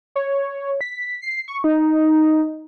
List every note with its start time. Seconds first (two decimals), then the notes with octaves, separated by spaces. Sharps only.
0.16 C#5
0.81 B6
1.22 C7
1.48 C#6
1.64 D#4